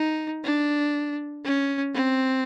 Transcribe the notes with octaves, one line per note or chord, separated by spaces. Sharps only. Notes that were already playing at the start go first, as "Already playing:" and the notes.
Already playing: D#4
D4
C#4
C4